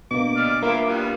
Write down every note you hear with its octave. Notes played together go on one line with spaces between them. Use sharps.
B2 A#3 D4 D6
D5 D#5 F6
E3 A#3 E4 F4
G3 B3 F4